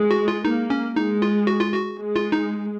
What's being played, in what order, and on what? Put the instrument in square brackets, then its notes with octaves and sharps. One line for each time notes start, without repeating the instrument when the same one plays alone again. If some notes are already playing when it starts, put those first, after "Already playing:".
Already playing: [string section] G#3
[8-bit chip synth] F#4
F4
[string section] A#3 [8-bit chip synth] D#4
[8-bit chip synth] C#4
[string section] G#3 [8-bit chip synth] D#4
[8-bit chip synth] F4
F#4
F4
F#4
[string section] G#3
[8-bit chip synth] F4
D#4